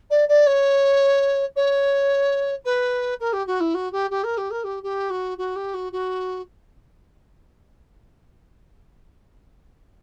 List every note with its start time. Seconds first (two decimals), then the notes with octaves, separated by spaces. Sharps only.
0.10 D5
0.28 D5
0.46 C#5
1.56 C#5
2.65 B4
3.20 A#4
3.33 G4
3.47 F#4
3.60 E4
3.74 F#4
3.92 G4
4.10 G4
4.23 A#4
4.37 G4
4.50 A#4
4.64 G4
4.83 G4
5.10 F#4
5.38 F#4
5.56 G4
5.74 F#4
5.92 F#4